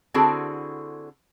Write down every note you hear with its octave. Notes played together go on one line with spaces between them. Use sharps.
D3 C4 E4 F#4 G#4 A4